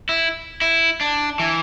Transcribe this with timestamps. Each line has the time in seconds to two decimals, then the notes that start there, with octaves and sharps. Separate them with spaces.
0.09 E4
0.61 E4
1.01 D4
1.39 E3